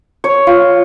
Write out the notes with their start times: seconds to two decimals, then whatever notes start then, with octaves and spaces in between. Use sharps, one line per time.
0.24 C#5
0.47 F4